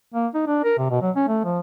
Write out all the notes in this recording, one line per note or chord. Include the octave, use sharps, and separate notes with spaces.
A#3
D#4
D4
A#4
C3
B2
F#3
C#4
A3
F3